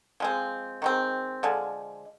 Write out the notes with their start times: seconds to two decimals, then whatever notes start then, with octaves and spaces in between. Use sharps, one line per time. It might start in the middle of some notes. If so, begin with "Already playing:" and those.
0.20 F3 G#3 C4
0.82 D#3 G#3 C4
1.43 D3 F3 G#3